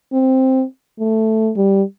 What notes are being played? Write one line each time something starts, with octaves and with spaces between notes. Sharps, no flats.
C4
A3
G3